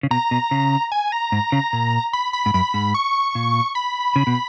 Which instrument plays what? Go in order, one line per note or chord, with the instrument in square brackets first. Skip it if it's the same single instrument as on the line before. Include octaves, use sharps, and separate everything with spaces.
[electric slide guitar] C#3
[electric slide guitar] B2 [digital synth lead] A#5
[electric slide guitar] B2
C#3
[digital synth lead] G#5
A#5
[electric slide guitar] G#2
C#3
A#2
[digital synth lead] B5
B5
[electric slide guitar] G#2
[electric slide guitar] F#2 [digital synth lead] B5
[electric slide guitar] G#2
[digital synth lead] C#6
[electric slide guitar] A#2
[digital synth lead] B5
[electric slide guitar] C#3
B2